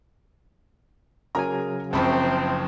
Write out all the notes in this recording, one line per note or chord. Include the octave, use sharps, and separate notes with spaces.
C#3 F#3 G#4 A#4 G#5 A#5
F#1 F#2 F3 C4 A5 B5 C#6